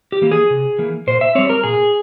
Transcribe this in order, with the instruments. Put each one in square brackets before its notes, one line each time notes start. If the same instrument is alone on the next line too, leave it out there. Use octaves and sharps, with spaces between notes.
[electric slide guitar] G4
E3 A#3
G#4
C3
E3 A#3
A#2 C5
E5
G3 C4 C#5
A#4
A#2 G#4